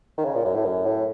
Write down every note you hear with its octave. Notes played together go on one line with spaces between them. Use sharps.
D#3
C#3
A#2
F#2
A2
F#2
A2